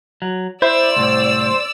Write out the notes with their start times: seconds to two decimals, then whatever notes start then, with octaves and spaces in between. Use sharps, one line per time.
0.22 F#3
0.62 E4 C5 D5 E6
0.96 C2 A2